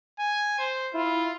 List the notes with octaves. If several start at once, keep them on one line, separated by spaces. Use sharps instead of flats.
G#5
C5
E4 F4